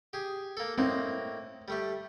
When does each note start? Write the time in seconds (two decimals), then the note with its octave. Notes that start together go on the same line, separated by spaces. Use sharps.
0.13 G4 G#4
0.57 A#3 A4
0.78 A2 A#3 C4 D#4
1.68 G3 A3 G4